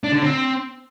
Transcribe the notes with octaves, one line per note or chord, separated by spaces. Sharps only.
D4
D3
C4